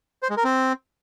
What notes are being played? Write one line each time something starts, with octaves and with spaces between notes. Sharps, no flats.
C5
G#3
A#4
C4